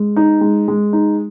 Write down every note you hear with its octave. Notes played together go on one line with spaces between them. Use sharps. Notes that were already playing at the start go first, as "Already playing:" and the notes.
Already playing: G#3
D#4
G#3
G#3
D#4